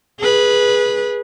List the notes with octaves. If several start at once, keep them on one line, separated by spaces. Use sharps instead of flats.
G#4 B4